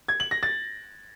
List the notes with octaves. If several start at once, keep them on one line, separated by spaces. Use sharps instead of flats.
G#6
F#7
A#6
A6